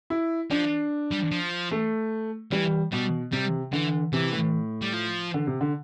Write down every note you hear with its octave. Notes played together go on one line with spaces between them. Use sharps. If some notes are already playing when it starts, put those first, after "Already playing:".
E4
F3 D4
G3
F3
A3
E3 G3
B2 G3
C3 G3
D3 E3
C3 E3
A2
G3
F3
D3
C3
D3